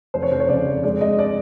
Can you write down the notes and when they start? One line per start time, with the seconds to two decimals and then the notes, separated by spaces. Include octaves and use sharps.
0.14 F1 C5
0.22 C#5
0.32 F1 C5
0.40 C#5
0.49 C#3 D5
0.66 F1
0.84 G#3 D5
1.01 G#3 D#5
1.19 D5